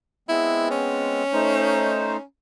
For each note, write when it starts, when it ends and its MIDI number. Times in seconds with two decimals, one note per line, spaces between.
0.29 1.23 56
0.29 1.23 59
0.29 1.23 60
0.29 0.69 64
0.71 2.22 61
1.33 2.17 57
1.33 2.17 63
1.33 2.17 72